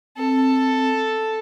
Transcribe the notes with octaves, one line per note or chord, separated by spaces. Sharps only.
C4 A4